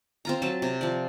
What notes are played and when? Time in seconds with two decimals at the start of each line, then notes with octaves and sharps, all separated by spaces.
0.25 C4 F4 A#5
0.42 F#3 C4 A5
0.62 C3
0.81 F3 D5